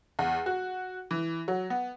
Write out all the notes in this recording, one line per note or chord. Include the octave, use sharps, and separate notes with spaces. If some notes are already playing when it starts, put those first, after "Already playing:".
E2
F#4
E3
F#3
B3